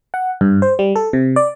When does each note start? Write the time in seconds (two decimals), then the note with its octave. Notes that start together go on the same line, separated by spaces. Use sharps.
0.14 F#5
0.41 G2
0.62 C5
0.79 G3
0.96 A4
1.13 C3
1.36 D5